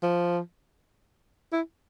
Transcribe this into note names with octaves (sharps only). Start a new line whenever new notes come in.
F3
E4